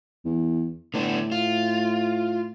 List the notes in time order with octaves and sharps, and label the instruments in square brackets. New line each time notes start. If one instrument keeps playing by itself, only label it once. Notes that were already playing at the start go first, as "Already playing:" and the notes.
[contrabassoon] E2
[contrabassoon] A2 [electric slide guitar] D3 B3 D4
[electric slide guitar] F4